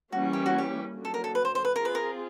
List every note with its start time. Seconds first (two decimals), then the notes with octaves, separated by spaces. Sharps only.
0.12 E3 G3 A#3 C#4 F#4
0.33 G4
0.46 F#4
0.58 G4
0.94 D3 F#3 A#3
1.05 A4
1.14 A#4
1.24 A4
1.35 B4
1.45 C5
1.55 C5
1.65 B4
1.76 C4 F4 G#4 A#4
1.85 B4
1.95 A#4